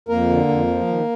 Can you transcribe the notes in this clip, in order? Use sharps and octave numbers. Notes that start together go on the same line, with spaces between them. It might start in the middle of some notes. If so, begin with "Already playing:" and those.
F2 A#3 A#4
D3
F2
F3
D#3